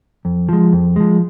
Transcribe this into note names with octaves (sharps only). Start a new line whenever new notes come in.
F2
F3 G#3
F2
F3 G#3